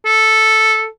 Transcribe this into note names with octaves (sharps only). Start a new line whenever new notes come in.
A4